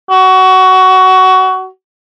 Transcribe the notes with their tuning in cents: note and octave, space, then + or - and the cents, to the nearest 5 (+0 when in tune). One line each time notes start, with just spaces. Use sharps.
F#4 +20